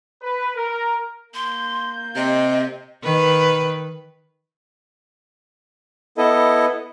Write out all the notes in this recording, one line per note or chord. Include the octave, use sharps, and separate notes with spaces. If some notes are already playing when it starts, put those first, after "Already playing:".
B4
A#4
A#3 C6 G6
C3 D#5
D#3 B4
B3 E4 A4 D#5